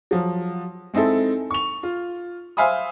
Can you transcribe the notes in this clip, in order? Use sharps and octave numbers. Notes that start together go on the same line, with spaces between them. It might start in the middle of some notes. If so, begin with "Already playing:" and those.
F3 F#3
G#3 C4 D#4 E4 A4
C#6 F7
F4
C5 E5 F5 G#5 B5 D#6